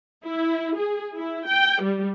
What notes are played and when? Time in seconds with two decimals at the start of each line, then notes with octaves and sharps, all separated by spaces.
0.24 E4
0.77 G#4
1.16 E4
1.48 G5
1.82 G3